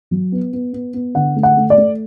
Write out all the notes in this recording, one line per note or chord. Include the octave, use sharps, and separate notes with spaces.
F#3
B3
B3
B3
B3
D3 F#5
A3
F#5
A3
D5
A3